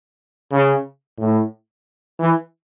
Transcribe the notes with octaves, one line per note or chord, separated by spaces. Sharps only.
C#3
A2
E3